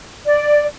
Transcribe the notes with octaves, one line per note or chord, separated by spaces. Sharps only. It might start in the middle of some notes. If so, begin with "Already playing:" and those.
D5